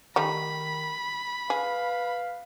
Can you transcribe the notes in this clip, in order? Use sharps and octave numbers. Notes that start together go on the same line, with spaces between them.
D#3 G3 A3 D#4 B5
G#4 B4 F5